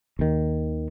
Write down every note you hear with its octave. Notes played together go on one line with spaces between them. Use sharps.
D#2 D#3